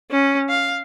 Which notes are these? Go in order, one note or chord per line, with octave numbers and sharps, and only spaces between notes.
C#4
F5